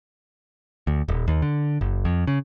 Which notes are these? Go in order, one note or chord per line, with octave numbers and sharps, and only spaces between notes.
D2
D#1
D#2
D3
F#1
F2
C#3